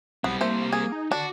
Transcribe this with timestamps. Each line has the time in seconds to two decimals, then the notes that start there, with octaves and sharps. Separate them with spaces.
0.24 B1 G3 B3 C4
0.41 A3 A#3 C5
0.73 A#3 G#4
0.92 D#4
1.12 D3 D4 F#4